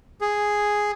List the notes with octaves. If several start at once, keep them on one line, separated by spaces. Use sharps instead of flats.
G#4